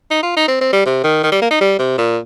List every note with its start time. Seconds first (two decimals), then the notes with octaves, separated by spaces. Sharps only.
0.11 D#4
0.23 F4
0.36 D#4
0.48 C4
0.61 C4
0.73 G3
0.86 C3
1.04 D#3
1.23 D#3
1.32 G3
1.41 A#3
1.51 D#4
1.61 G3
1.79 C3
1.98 A#2